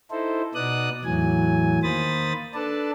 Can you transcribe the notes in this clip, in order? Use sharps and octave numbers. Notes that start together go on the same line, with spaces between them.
D#4 E4 A4 C5
B2 B3 D#4 D5 D#6 F#6
E2 A2 E3 F#3 G#5
D#3 A#3 C5 B5 D#6 A6
D4 A4 B4 D5 A5